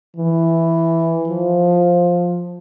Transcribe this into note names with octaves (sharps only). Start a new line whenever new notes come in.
E3
F3